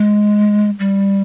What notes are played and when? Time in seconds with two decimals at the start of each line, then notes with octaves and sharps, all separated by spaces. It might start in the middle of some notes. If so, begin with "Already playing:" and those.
Already playing: G#3
0.79 G3